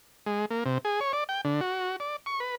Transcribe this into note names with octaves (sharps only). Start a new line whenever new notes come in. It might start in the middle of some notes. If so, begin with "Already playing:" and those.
G#3
A#3
C3
G#4
C#5
D5
G5
D3
F#4
D5
C#6
B4